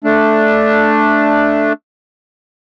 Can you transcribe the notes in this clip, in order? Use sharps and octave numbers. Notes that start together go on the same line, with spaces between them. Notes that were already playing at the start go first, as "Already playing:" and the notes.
A3 D4